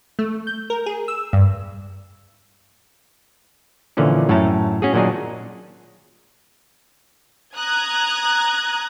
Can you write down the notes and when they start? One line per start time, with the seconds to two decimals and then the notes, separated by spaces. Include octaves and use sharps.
0.19 A3
0.47 G6
0.70 A#4
0.86 G#4
1.08 E6
1.33 G2
3.97 A#2 D3 E3 F3 C#4
4.29 F#2 A2 A3 C#4 A5 A#5
4.82 C#4 F#4 G#4
4.94 A#2 D#3 F#3 D4 D#4 G#4
7.56 A#5 D#6 F#6 G#6